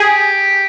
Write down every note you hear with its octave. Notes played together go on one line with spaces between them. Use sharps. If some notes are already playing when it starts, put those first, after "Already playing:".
Already playing: G4 G#4